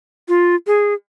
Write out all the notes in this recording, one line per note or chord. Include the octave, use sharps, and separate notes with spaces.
F4
G#4